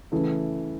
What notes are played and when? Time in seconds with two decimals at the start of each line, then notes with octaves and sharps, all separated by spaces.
0.12 C#3 E3 A3